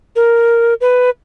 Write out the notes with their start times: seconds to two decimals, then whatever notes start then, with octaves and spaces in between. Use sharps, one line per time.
0.16 A#4
0.81 B4